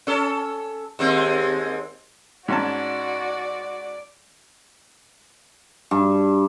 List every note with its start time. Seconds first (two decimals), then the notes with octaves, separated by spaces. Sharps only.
0.07 C#4 A4
0.99 D#2 G#3 C4
2.48 G#2 C#4 F#4 D5 A5
5.91 G2